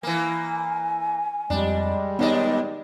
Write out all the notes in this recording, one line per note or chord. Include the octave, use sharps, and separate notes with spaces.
E3 A#3 G#5
F2 G3 G#3 D4
D#2 B3 D4 D#4 D5 D#5